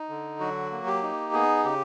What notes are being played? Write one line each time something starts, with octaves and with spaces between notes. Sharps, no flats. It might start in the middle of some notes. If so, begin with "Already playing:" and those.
Already playing: D#4
D3
F#3 F#4
A#3
G4
D#4
B3 G#4
C#3 G4